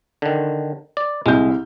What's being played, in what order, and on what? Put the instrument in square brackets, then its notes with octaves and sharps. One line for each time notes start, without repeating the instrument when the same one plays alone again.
[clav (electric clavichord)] D3 D#3
D5
[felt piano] C2 G6 [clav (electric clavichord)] G#3